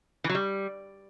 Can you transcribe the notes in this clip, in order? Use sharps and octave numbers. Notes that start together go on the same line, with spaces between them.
E3
F#3
G3